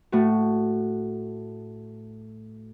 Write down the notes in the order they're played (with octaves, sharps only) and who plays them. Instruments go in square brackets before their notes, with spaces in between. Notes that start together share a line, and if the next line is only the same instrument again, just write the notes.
[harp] A2 A3 F#4